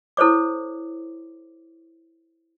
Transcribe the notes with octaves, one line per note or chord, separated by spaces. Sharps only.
E4 A4 C5 C#5 D6